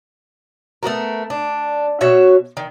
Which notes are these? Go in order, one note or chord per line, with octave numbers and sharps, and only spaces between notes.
A3 B3 F#4 A#4
D4
B2 F#4 C#5 E5
D#3